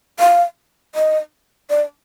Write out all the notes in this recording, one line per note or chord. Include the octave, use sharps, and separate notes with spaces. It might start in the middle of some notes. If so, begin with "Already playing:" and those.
F5
D#5
D5